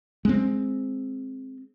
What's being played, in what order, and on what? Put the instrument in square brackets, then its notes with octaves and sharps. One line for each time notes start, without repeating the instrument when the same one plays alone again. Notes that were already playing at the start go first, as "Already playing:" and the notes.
[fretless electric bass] G#3 B3 C4